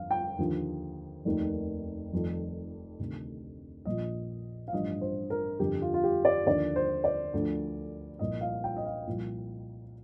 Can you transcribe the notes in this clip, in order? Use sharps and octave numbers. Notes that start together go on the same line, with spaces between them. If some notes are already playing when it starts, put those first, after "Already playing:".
Already playing: G1 F2 D3 F5
G5
D#2 D3 F3
F1 D#2 D#3
F1 F2 D#3
D2 C3 D#3
A#1 A#2 F3 D#5
F5
A1 G2 F3 D#5
C5
A#4
G1 F2 D3 G4
F4
F4
G4
D5
D#2 D3 F3 D5
C5
D5
D2 D3 F3
C2 A#2 F3 D#5
F5
G5
D#5
F5
C2 A#2 F3